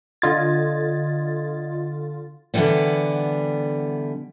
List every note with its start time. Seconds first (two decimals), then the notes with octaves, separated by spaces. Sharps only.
0.22 D3 F4 D#5 G#6 A6
2.54 B2 D3 E3 F#3 G3 B3